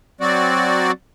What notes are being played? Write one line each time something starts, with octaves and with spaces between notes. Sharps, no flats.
F#3 C4 F#4 D5